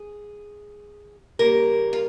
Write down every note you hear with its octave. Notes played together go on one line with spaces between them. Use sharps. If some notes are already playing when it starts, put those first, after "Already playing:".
Already playing: G#4
C#3 G3 A#3 A#4
F4